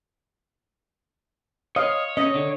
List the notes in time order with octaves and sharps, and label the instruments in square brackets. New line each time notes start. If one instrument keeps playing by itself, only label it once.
[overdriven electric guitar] C#5 [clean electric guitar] D#5 [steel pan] F5
[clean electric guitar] C#4 [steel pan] D#5
[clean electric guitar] D3